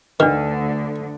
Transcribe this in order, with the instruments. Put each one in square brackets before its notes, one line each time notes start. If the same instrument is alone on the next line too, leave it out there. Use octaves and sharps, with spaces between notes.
[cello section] D2 D3 [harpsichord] D#3 [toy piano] D4 B4